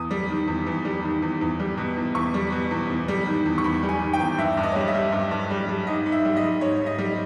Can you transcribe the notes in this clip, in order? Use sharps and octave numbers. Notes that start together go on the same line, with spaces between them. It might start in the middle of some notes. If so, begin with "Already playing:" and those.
Already playing: E2 D#6
G3
D#3
E2
E2
G3
D#3
E2
E2
G3
B2
E2
E2 C#6
G3
B2
E2
E2
G3
D#3
E2
C#6
E2 B5
G3
G#5
D#3
G5
E2
G2 E5
G2
D#5
C#5
G3 D#5
E5
G3
G2
G2
G3
G3
G#2 D#5
G#2
E5
G3
D#5
G3
G#2 C#5
G#2
D#5
G3